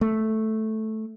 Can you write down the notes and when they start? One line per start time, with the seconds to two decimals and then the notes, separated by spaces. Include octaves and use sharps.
0.01 A3